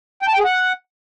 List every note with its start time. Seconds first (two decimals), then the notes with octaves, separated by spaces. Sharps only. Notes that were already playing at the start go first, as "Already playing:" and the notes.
0.22 G5
0.28 A5
0.33 G5
0.39 G#4
0.45 F#5